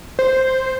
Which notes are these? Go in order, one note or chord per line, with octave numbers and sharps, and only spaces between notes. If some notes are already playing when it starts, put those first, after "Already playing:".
C5